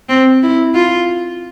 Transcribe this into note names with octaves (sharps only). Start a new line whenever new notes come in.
C4
E4
F4